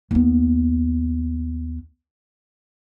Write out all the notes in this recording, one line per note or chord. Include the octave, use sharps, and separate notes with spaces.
D#2 B3